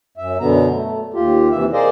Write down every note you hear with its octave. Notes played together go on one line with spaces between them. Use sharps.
F#2 E5
F#2 B2 D3 B3 A#5
A3
D#2 F4 G4
D#2 C3 E3 E5
G#4 A#4 C5 D5 D#5 F5